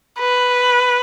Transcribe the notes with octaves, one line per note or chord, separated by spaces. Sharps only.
B4